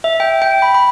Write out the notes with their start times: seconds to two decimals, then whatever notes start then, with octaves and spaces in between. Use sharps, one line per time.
0.04 E5
0.20 G5
0.42 G5
0.62 B5
0.75 B5